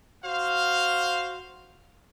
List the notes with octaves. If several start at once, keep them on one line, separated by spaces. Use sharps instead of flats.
F#4 C5 F5